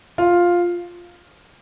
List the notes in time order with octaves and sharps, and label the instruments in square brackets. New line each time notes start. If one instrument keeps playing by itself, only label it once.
[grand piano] F4